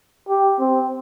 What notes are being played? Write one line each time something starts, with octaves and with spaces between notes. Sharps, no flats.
G4
C4